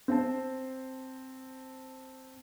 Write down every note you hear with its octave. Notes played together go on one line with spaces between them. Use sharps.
C4 C5 A5